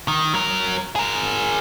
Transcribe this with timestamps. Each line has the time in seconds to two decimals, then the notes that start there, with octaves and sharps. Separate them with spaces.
0.08 D#3
0.34 F#3 A#4
0.96 G#4 A#4